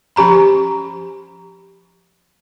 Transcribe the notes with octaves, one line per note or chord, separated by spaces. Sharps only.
F3 C#4 G4 A#5 B5